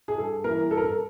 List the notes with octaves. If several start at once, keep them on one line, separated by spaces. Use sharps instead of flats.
G#4
G2 A4
E3 G3 A#3 A#4
G2 A4
A#4
A4